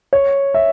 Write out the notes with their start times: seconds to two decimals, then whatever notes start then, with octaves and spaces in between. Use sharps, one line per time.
0.13 C#5
0.54 E5